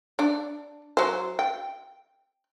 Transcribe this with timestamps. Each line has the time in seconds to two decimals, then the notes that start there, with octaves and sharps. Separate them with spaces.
0.19 D4 D5
0.97 F#3 C5
1.39 G5